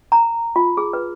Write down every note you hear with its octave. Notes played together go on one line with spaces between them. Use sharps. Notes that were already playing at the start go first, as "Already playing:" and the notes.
A#5
F4
G#4
B4